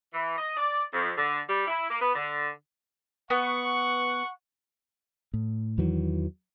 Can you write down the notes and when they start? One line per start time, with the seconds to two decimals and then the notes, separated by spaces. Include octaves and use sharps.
0.13 E3
0.38 D#5
0.57 D5
0.93 F2
1.17 D3
1.49 G3
1.67 E4
1.90 A#3
2.01 B3
2.15 D3
3.30 B3 F#5 C#6
5.34 A2
5.78 E2 D#3 E3 F#3